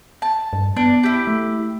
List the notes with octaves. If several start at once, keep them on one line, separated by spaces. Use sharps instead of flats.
A5
G2
B3 D4
E4 G4
A3